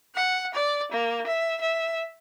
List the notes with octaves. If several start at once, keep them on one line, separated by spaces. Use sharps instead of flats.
F#5
D5
A#3
E5
E5